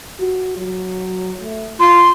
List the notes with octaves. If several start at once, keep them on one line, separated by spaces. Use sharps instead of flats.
F#4
F#3
A3
F4 C6